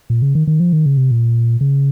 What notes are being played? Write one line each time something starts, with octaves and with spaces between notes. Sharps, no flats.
A#2
C#3
D#3
D#3
F3
D#3
C#3
C3
A#2
C#3